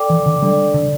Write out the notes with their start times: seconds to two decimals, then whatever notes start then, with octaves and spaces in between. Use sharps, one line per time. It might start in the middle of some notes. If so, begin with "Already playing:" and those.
Already playing: A4 D5 G5 D6
0.10 E3
0.26 D3
0.42 G3 D4 A4 D5
0.74 D3